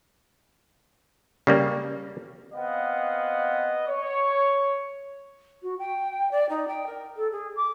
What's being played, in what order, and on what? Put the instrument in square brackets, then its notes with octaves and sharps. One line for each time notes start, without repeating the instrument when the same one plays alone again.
[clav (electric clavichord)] C#3 G3 A#3
[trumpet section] B3 C4 D#5 F5 F#5
C#5
[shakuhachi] F#4
G5
D5
D#4
G5
A#4
A4
G#4
D6